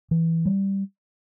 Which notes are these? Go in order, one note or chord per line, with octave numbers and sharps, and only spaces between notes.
E3
G3